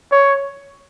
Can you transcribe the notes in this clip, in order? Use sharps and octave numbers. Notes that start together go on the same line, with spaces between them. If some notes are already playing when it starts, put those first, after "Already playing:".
C#5